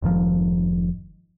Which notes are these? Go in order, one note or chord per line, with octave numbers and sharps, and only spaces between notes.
F1 G#2 D#3 F3